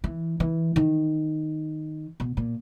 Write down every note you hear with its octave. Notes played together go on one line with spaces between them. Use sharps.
E3
E3
D#3
B2
A#2